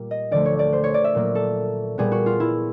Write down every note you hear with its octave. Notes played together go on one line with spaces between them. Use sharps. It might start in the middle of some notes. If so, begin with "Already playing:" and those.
Already playing: A#2 G3 A#3
D#5
D2 D3 F3 A3 D5
C#5
D5
C5
C#5
D5
E5
A#2 F#3 A#3
A4
A#2 G3 B3 G#4
F#4
F4
E4